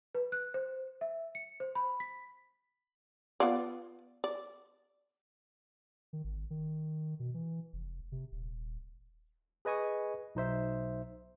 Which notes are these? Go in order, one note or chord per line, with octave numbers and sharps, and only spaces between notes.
B4
F#6
C5
E5
C#7
C5
B5
B6
B3 F4 D5
D5
D#3
G#1
D#3
B2
E3
F1
C3
D#1
G#4 B4 D#5 G#5 C#6 D#6
B1 D#4 C5 E5